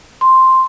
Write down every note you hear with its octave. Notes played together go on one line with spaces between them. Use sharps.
C6